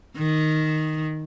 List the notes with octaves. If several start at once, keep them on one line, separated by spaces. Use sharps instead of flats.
D#3